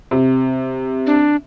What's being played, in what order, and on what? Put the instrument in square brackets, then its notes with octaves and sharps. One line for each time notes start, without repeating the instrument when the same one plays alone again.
[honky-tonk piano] C3
[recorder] D4